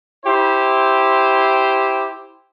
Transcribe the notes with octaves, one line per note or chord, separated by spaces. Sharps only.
E4 G4 C5